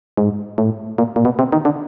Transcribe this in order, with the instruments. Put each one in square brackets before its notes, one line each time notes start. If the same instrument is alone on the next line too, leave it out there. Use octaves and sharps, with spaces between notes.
[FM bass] G#2
A2
A#2
A#2
B2
C3
D#3
D3